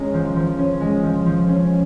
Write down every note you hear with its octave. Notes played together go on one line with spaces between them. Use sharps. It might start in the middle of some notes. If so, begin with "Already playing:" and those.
Already playing: G#3 C#4 A#4
F3
F3
C#4
G#3
F3
F3
C#4